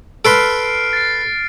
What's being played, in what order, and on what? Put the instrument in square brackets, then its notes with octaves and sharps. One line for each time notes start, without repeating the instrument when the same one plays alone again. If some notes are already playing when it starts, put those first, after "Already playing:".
[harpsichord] A4 B4 C6 [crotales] F6 C7 D7
[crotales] A6 C7